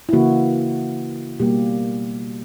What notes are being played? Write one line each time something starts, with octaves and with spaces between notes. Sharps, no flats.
E4
C#3 E3 A#3 F#4
B2 G3 A#3 G4